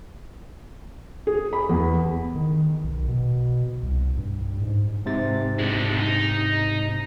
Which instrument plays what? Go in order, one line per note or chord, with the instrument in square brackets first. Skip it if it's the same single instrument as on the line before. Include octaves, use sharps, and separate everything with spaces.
[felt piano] G#4
B5
E2
[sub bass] D#3
B1
B2
C2
G2
G#2
[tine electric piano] G#2 C3 A6
[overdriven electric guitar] G#3 D4
D#4